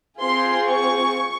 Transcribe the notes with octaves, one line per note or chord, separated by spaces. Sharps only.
C4 F4 G#4 C6
C#6